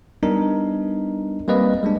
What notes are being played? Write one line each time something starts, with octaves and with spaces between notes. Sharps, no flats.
G3 B3 D4 D#4 A#4
G3 A#3 C4 B4 D5 D#5
G3 G#3 A#3 D4